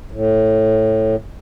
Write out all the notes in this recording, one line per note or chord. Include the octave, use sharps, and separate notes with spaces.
A2